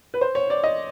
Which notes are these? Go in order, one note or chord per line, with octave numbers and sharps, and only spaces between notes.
B4
C5
C#5
D5
D#5